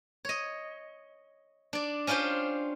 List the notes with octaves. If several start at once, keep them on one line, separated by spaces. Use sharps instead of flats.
C#5 D#5
D4 D5
C#4 D4 F4 G4 C5